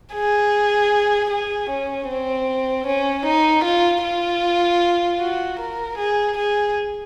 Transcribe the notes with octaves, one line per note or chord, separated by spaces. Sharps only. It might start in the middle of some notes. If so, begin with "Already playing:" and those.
G#4
G#4
C#4
C4
C#4
D#4
F4
F4
F#4
A#4
G#4
G#4